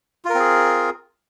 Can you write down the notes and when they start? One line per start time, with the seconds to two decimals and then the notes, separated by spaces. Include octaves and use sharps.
0.25 F4
0.30 A#4
0.35 C4
0.39 G#4